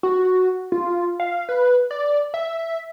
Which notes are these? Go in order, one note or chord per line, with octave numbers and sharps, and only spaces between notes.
F#4
F4
F5
B4
D5
E5